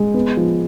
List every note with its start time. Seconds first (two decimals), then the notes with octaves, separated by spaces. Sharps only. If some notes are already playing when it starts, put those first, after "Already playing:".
Already playing: G#3
0.14 B3
0.37 F3